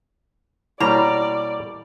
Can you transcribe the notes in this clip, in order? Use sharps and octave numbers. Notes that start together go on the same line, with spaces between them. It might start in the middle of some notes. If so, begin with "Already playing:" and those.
B2 G3 A#3 E4 C#5 D5 A#5